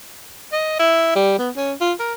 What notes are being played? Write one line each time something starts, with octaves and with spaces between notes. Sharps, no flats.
D#5
E4
G3
B3
C#4
F4
A#4